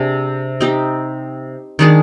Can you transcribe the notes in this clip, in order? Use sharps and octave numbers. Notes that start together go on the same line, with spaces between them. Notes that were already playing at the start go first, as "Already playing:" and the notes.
Already playing: C3 D4 G#4
C4 D#4 G4
D#3 G#3 D4 G#4